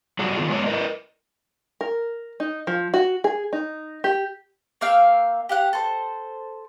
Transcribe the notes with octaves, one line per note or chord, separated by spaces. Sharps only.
F#3 G3 F#4 G#4
D#3 B3 F4
G#3 B3 C#5 D5
A#4 B4 D#5
A#4
D#4
F3
F#4
G#4
D#4
G4
A#3 E5 F5 G5
G4 F5 F#5
A4 C5